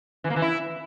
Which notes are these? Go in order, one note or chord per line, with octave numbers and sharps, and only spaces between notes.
E3
A#3
E3
E4